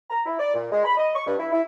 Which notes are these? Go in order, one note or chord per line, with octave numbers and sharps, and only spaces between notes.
A#5
E4
D5
A#2
G#3
B5
D#5
C#6
G2
E4
E4